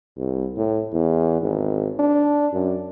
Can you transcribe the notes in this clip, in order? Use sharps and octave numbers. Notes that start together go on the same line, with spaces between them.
C2
A2
E2
G#1
D4
F#2